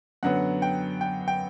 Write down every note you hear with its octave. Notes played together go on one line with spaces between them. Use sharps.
F#2 D3 F#3 B3 F#5
G5
G5
G5